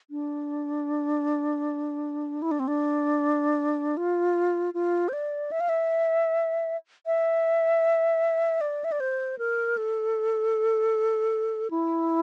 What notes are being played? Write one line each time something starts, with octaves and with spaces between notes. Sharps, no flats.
D4
E4
D4
C4
D4
F4
F4
C5
D5
E5
F5
E5
E5
D5
E5
D5
C5
A#4
A4
E4